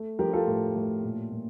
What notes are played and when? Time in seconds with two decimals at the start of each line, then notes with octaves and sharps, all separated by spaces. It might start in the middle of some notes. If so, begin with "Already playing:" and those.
Already playing: A3
0.19 F3 G4 A#4
0.33 F4 A4
0.48 A2
0.75 A2
1.04 A#2
1.32 A#2